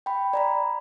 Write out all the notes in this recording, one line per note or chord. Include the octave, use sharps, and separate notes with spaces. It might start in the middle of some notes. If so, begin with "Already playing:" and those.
G5 B5
D5 A#5 B5